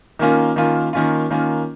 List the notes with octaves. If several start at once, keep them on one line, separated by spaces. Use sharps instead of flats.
D#3 A#3 C#4 F4
D#3 A#3 C#4 F4
D#3 A#3 C#4 F4
D#3 A#3 C#4 F4